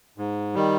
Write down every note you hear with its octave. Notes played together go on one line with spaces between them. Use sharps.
G#2
D#3 G3